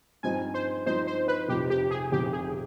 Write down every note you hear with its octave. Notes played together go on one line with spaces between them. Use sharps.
G2 F3 C4 D#4 G#5
C5
G2 F3 C4 D#4 C5
C5
B4
F1 F2 C3 F3 G4
G4
G#4
F1 F2 C3 F3 G4
G#4